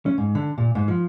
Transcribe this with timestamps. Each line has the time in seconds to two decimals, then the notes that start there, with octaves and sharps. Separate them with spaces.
0.06 C#4
0.18 G#2
0.35 D3
0.58 A#2
0.75 G#2
0.88 F3